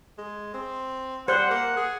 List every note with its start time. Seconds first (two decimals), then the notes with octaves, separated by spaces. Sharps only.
0.18 G#3
0.54 C4
1.28 G3 C5 F#5
1.51 A#3
1.77 G#4